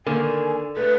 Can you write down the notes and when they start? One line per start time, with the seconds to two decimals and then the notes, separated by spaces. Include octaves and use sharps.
0.06 D3 D#3 A#3 G#5
0.77 A3 B4